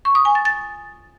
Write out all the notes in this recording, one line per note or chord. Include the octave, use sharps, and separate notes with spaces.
C#6
D#6
G#5
A6
A6